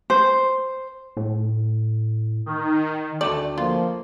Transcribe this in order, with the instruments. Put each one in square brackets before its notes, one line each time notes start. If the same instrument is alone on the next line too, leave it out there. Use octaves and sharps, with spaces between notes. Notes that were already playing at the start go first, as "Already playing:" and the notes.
[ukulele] C5
[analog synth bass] A2
[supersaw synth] D#3
[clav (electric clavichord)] D2 A3 G5 [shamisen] D5
[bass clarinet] F3 [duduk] A#3 [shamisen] F4